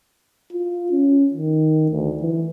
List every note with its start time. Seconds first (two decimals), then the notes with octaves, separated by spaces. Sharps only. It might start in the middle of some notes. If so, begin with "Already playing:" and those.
0.53 F4
0.91 C#4
1.34 D#3
1.91 D2
2.21 E3